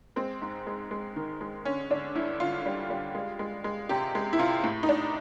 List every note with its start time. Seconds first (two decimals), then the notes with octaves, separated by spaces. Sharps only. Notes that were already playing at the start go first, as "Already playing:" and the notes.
0.16 G#3 C4
0.42 G#2
0.67 G#3
0.91 G#3
1.16 D#3
1.41 G#3
1.65 D3 C#4
1.90 D3 D4
2.15 G2 E4
2.40 D3 F4
2.66 G3
2.90 G3
3.15 G#3
3.39 G#3
3.64 G#3
3.89 C3 G4
4.15 G#3
4.33 E4
4.39 C3 F4
4.64 A2
4.83 D#4
4.89 A2 D4